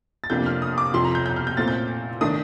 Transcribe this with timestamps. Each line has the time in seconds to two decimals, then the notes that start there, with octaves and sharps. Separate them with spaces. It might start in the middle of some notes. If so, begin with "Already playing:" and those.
0.24 A6
0.30 F2 C3 F3 A#3 D4 G6
0.46 F6
0.62 D#6
0.78 D6
0.94 F2 C3 F3 C6
1.05 A#5
1.15 G6
1.26 G6
1.36 F6
1.47 G6
1.57 A#2 A3 C4 A6
1.68 G6
2.21 D#3 A3 D4 D#6